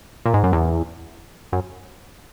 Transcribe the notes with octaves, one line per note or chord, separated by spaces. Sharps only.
A#2
G#2
F#2
E2
F#2